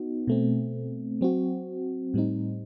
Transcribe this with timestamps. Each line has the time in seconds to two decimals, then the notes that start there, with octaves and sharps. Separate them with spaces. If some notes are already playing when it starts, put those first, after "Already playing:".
Already playing: B3 D#4 F#4
0.27 B2 A3 C4
1.21 F#3 C4 F#4
2.14 A2 G3 C4 D#4